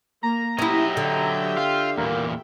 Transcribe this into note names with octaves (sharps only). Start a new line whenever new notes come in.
A#3 A#5
F#3 C#4 E4 G4 D#5 E5 G5
D3
F4 F5
E2 A#2 A#3